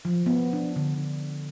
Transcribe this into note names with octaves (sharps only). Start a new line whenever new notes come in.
F3
B3
D4
D3